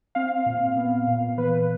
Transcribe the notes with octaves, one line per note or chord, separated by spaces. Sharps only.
C4 F5
A#2
B3
A#2
E3 B4